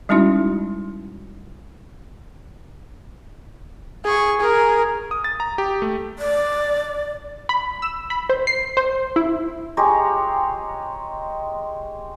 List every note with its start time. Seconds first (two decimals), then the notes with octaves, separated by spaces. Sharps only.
0.09 G3 G#3 C#4 D#4 E4 F#4
4.05 G#4 C#6
4.41 G#4 A#4
5.11 D#6
5.24 A6
5.40 A#5
5.58 G4
5.82 A3
6.19 D5
7.49 B5
7.82 E6
8.10 B5
8.30 C5
8.47 C7
8.77 C5
9.16 E4
9.77 G#3 G4 C#5 A#5